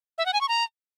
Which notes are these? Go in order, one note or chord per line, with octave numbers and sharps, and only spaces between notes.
E5
F#5
G#5
C#6
A#5